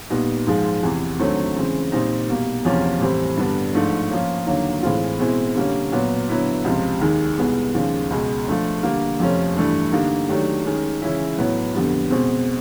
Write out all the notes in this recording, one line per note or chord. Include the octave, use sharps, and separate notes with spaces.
A#2 G3 B3 D#4
G#2 F3 G#3
E2 C3 E3
D#2 D3 F#3 A3 C4
C#3 E3 G#3 C4
A#2 G3 C4 D#4
B2 G3 A#3
E2 C3 F3 A#3 C#4
A2 E3 G3 C4
G2 D3 G3 B3 D4
G#2 F3 A3 D4
F3 A#3 C#4
D#2 D3 F#3 A#3
A2 E3 G#3 C4 F4
B2 G#3 C4 E4
D3 G3 A#3 C#4
A#2 F#3 B3
D3 F#3 B3 E4
C#2 C3 F3
D#2 D#3 G#3
C2 B2 G#3 B3
D#2 C#3 F3 G#3
C#2 B2 G#3
F3 A3 D4
D3 G3 A#3
F2 C3 F3 A3 C#4
G2 E3 A3 D4
D3 G3 A#3 D#4
D#3 F#3 A3 D4 G4
D#3 G#3 C#4
C#3 E3 G#3 C#4 E4
A2 F#3 B3
F2 D3 G3 B3
B2 G#3 C4